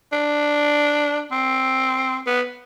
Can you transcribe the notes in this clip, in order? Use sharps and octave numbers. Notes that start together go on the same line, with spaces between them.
D4
C4
B3